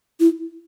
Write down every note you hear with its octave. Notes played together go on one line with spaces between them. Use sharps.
E4